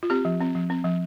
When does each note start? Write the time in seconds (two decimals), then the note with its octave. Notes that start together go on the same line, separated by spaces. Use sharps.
0.03 F4
0.10 C4 G4
0.25 F3
0.41 C4
0.55 F3
0.70 C4
0.84 F3